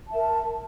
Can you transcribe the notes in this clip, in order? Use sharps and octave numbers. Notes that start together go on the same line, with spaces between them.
A#4 E5 A5